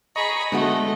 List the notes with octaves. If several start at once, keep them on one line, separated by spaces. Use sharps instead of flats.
G#4 D#5 A#5 B5 C#6
D3 G#3 A3 B3 F#4 D#5